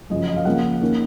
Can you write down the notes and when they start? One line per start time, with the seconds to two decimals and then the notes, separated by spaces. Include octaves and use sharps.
0.10 F#2 C#3 F3 D#5
0.27 D#5
0.36 F5
0.45 C#3 F3 A#3 F#5
0.81 D#3 A#3 C#4